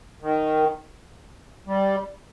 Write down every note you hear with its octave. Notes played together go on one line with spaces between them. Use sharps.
D#3
G3